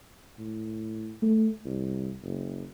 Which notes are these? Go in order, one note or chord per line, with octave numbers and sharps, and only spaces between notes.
A2
A3
C2
F#1